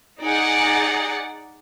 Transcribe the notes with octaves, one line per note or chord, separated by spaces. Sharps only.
D#4 G#4 D5 F#5